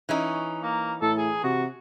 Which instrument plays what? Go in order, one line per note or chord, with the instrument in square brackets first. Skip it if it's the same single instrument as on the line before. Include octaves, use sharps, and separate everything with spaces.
[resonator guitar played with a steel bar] E3 C#4 D#4
[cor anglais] A#3
[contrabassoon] A2 [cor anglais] A4
[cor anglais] G#4
[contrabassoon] C3 [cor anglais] F#4